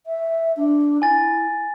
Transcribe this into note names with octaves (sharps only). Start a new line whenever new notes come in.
E5
D4
E4 G#5 A6